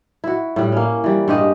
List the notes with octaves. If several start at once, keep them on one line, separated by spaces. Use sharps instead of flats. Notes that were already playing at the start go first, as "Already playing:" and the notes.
E4 F#4
A2 G3
A#3 C#4
E3 G3
G2 G#3 G4 D#5